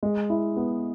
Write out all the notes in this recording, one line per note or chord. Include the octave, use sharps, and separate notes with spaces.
G#3
E4
B3